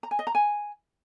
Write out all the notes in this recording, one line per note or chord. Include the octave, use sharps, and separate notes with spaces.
A#5
G#5
D#5
A#5
G#5